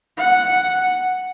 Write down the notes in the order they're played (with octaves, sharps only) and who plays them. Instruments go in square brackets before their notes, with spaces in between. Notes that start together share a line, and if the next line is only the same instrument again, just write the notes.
[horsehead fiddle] F#5